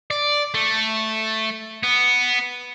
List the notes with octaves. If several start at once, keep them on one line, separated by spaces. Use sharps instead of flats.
D5
A3
B3